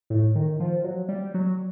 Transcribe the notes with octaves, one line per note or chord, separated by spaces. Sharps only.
A2
D#3
F3
F#3
G3
F#3